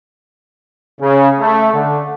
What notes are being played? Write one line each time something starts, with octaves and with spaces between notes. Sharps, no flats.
C#3
A3
D3